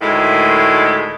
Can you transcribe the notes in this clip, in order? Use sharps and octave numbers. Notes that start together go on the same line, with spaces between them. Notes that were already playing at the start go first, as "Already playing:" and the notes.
D2 A2 D#3 G#3